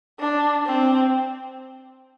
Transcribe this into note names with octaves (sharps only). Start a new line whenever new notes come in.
D4
C4